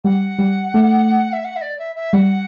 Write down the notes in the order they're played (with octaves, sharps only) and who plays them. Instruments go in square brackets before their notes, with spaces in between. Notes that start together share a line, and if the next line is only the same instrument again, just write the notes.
[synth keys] G3 [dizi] F#5
[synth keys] G3
A3
[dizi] E5
F#5
E5
D5
E5
E5
[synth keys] G3 [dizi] F#5